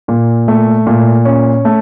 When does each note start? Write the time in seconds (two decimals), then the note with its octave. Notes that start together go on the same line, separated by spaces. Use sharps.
0.08 A#2
0.48 A3
0.86 A#2
1.25 C#4
1.65 A3